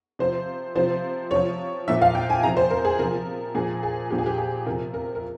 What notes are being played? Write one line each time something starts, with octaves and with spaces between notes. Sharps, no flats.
C3 F3 C5
C3 F3 C5
C3 F3 C#5
A#2 F3 E5
F5
G5
G#5
C3 F3 A#5
C5
A#4
G#4
C3 F3 A#4
A#2 F3 G#4
G#4
A#2 F3 G4
G#4
G4
G#4
C3 F3 A#4
A#4
A#4